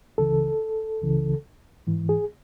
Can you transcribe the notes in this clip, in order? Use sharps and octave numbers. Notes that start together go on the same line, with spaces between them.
C#2 C#3 E3 A4
C#2 C#3 E3
G#2 E3
G#4